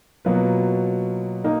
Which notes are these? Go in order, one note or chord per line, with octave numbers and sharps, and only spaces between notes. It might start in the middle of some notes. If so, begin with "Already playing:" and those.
B2 F#3 A#3 F4 B4
A#3 D#4 A#4